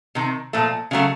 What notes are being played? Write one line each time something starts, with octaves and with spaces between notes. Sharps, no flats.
C3 D#3
A#2 F3 A3
C#3 F#3 A3